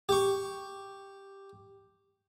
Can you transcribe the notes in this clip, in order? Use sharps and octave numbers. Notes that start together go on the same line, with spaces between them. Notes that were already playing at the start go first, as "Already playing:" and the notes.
G4 C#6